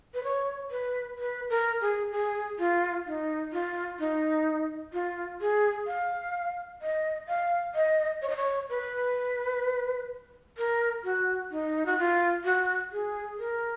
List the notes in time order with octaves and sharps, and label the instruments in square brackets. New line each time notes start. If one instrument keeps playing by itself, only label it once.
[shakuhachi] B4
C#5
B4
B4
A#4
G#4
G#4
F4
D#4
F4
D#4
F4
G#4
F5
D#5
F5
D#5
C#5
D#5
C#5
B4
A#4
F#4
D#4
F#4
F4
F#4
G#4
A#4